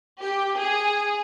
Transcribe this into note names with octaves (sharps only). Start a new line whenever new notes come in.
G4
G#4